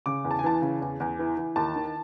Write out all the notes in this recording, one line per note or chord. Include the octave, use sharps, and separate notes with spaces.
C#3 D6
E2
A5
G#5
E3 A5
C#3
E2
E2
E3
E3
D#2 A5
D#3